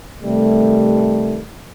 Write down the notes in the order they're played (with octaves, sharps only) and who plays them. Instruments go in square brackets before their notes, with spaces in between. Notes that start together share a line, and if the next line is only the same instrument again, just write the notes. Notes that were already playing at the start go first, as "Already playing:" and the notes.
[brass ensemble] C3 D#3 G3 A3